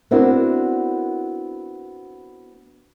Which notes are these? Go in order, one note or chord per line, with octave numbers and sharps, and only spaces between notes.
B3 C4 D4 E4 F#4 A#4